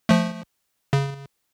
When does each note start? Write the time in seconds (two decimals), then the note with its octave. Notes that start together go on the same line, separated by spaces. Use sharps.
0.09 F3 A3
0.93 C#3